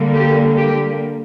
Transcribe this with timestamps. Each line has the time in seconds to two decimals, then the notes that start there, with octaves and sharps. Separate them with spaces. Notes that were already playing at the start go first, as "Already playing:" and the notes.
Already playing: D3 G3 A#3
0.14 G4
0.56 G4